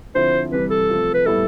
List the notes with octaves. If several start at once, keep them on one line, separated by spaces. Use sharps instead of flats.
D3 F3 C4 E4 C5
C3 E3 G3 B4
A4
C3 F3 A3
B4
A2 G3 B3 E4 A4